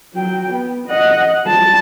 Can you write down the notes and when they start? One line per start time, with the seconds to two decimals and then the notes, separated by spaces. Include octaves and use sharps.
0.14 F#3 G5
0.51 B3
0.88 D#5 F#5
1.44 G3 A5